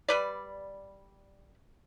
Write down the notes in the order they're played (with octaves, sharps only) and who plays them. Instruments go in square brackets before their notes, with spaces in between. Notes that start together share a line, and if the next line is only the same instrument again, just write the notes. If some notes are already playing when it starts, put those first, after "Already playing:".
[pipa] G3 B4 D5